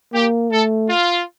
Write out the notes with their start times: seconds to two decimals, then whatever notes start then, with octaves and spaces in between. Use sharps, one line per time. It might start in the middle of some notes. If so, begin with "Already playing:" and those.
0.13 A#3 G4
0.52 A3 A4
0.89 F4